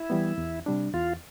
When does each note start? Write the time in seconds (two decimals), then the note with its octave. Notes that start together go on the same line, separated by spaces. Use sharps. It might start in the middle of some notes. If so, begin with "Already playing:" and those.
Already playing: E4
0.10 E3 G3 B3
0.38 E2
0.66 C3 G3 D4
0.94 E2 F4